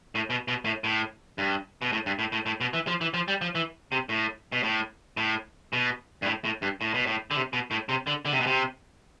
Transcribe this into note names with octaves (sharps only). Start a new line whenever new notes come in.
A2
B2
B2
A2
A2
G2
B2
A2
G2
A2
A2
A2
B2
E3
F3
E3
F3
G3
F3
E3
C3
A2
B2
A2
A2
B2
G2
A2
A2
G2
A2
B2
A2
D3
C3
B2
A2
C3
D3
D3
C3
B2
C3